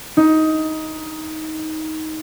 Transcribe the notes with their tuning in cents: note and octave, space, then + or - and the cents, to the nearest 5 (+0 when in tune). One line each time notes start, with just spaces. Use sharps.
D#4 +15